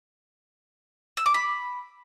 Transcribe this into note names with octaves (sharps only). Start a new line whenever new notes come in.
E6
D6
B5